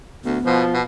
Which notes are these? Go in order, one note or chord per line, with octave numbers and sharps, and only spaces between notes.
D2 B3
B2 F3
B2